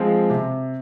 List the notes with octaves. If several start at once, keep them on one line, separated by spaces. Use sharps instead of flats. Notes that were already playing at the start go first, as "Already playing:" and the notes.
Already playing: F3 G#3 C4
C3